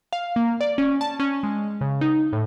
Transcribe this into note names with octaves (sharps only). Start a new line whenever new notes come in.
F5
A#3
D5
C#4
A5
C#4
G#3
C#3
D#4
A2